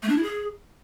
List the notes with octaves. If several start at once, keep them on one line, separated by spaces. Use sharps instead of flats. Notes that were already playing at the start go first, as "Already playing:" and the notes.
A3
D4
E4
G#4